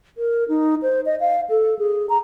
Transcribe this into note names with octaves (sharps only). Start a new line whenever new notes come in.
A#4
D#4
C5
D#5
F5
A4
G#4
A#5